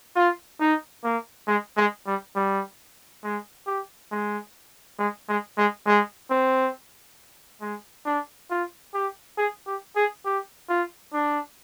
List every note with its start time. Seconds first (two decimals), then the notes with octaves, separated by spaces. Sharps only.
0.16 F4
0.60 D#4
1.04 A#3
1.48 G#3
1.77 G#3
2.07 G3
2.36 G3
3.24 G#3
3.67 G4
4.11 G#3
4.99 G#3
5.29 G#3
5.58 G#3
5.87 G#3
6.30 C4
7.61 G#3
8.05 D4
8.50 F4
8.94 G4
9.38 G#4
9.67 G4
9.96 G#4
10.25 G4
10.69 F4
11.13 D4